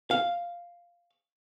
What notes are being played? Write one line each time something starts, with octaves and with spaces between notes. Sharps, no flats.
F5